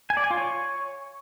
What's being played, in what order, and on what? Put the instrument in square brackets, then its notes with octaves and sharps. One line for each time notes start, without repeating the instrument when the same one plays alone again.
[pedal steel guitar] G#5
D5
G#5
F4
C#5